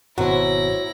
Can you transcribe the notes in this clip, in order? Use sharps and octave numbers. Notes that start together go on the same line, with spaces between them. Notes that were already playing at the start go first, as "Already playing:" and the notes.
G#1 B2 F#3 E4 F#4 C5 A#6